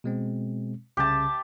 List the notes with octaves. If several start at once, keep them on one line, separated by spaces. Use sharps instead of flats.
B2 G#3 C4
C2 C#3 G4 A5